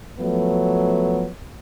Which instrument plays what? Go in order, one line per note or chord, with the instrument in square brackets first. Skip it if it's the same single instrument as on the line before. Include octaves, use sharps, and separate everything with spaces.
[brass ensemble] F3 F#3 A3 B3